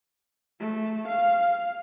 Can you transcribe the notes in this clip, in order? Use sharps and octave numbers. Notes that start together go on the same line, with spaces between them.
A3
F5